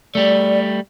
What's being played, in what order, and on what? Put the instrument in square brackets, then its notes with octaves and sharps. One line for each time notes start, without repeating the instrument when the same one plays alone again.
[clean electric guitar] G3 A3 [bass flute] D5